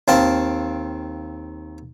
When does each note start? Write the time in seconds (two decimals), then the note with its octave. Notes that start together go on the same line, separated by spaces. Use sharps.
0.08 D#2 C4 F5 A5